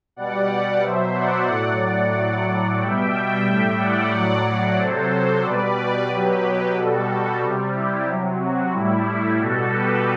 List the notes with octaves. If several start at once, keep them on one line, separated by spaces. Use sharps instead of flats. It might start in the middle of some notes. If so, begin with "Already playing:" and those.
B2 G3 D5 F#5
D5 F#5
B2 F#3 C5 E5
D5 F#5
A2 F#3
D5 F#5
A2 F#3
B2 G3 E5 G5
A2 G3
D5 F#5
A2 F#3
C3 F#3 A4 C5
B2 G3 B4 D5
B2 F#3 G4 B4
B2 G3 F#4 A4
C3 G3
E4 G4
C3 F#3
F#4
A2 G3 E4
B2 G3 F#4 A4
G4 B4